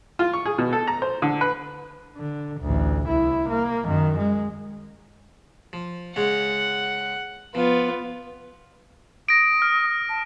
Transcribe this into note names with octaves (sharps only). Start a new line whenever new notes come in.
F4
C#6
G#4
B2
A4
A#5
C5
D3
B4
D3
A1 D2
C2 E4
A#3
F#2 D#3
G#3
F3
C#3 G#3 C#4 F#5
F3 B3 F4
D#6 A#6 D7
F6
A5